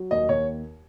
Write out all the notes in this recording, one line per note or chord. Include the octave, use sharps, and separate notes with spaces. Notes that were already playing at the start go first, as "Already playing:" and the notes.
Already playing: F#3
D#2 D#5
D#2 C#5